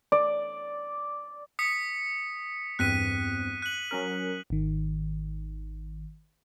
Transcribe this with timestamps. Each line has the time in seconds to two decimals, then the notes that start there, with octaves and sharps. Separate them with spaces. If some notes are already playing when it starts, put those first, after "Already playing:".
0.12 D5
1.59 D#6 B6 C#7
2.79 E2 G2 C4 F#6 B6 D#7
3.62 F#6 F#7
3.91 F#3 C#4 A#4
4.50 G#1 D#3